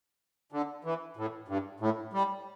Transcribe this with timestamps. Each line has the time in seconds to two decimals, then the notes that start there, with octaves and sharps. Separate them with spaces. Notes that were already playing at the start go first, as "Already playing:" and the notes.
0.52 D3
0.84 E3
1.17 A2
1.48 G2
1.80 A2
2.13 G3